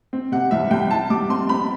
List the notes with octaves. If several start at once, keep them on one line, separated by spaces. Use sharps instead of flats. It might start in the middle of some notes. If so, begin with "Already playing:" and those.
C4
C3 F#5
C2 E5
C2 G5
E4 A5
G3 D6
C4 C6
C4 B5